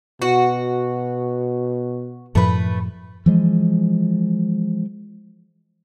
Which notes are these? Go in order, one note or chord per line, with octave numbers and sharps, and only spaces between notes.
B2 F#4
F#2 A2 F3 A3 B4
E3 F3 G#3